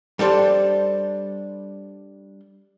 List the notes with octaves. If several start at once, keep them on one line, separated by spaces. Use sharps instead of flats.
G3 D4 A4 C5